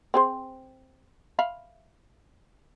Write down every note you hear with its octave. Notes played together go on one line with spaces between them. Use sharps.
C4 G#4 C5
E5 F5 B5